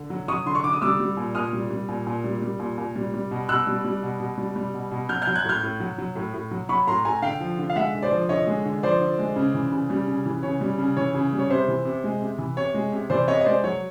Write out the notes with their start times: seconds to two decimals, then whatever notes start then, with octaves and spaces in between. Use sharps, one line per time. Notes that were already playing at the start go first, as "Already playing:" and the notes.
Already playing: D3
0.10 F#3
0.28 F#3 C#6 D#6
0.46 D3 C6
0.55 C#6
0.64 D3 D6
0.73 D#6
0.82 G3 D6 E6
1.00 G3
1.17 A#2
1.35 A#2 D#6 F6
1.53 G3
1.70 G3
1.89 A#2
2.07 A#2
2.24 G3
2.42 G3
2.59 A#2
2.78 A#2
2.96 G3
3.14 G3
3.31 B2
3.49 B2 E6 F#6
3.67 G3
3.85 G3
4.03 B2
4.20 B2
4.38 G3
4.56 G3
4.74 B2
4.91 B2
5.09 F#3 F6 G6
5.22 F6 G6
5.27 F#3
5.35 F#6 G#6
5.45 A2 F6 G6
5.63 A2
5.80 F#3
5.98 F#3
6.16 A2
6.34 A2
6.51 F#3
6.69 F#3 B5 C#6
6.87 A2 A#5 C6
7.05 A2 G#5 A#5
7.22 D3 F5 G5
7.40 F3
7.59 D3
7.70 F5
7.76 G#3 E5 F#5
7.95 D3
8.02 C5 D5
8.12 F3
8.29 D3 C#5 D#5
8.47 G#3
8.65 D3
8.83 F3 C5 D5
9.01 D3
9.19 G#3
9.36 C#3
9.54 E3
9.72 C#3
9.90 G3
10.08 C#3
10.26 E3
10.43 C#3 C#5
10.61 G3
10.78 C#3
10.97 E3 C#5
11.14 C#3
11.33 G3
11.39 C#5
11.49 C3 C5
11.68 E3
11.85 C3
12.04 G#3
12.21 C3
12.38 E3
12.57 C3 C#5
12.74 G#3
12.92 C3
13.10 E3 C5 D5
13.28 C3 C#5 D#5
13.41 D#5
13.45 G#3 C5 D5
13.64 F#3 C#5